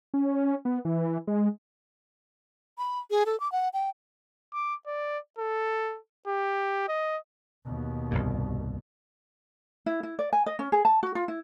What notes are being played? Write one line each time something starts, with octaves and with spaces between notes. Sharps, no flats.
C#4
B3
E3
G#3
B5
G#4
A4
D6
F#5
G5
D6
D5
A4
G4
D#5
D#2 B2
C2 G2 A#2
E4
E4
D5
G#5
D#5
C#4
G#4
A5
F#4
F4
E4